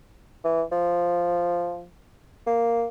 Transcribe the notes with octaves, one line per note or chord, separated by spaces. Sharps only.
E3
F3
A#3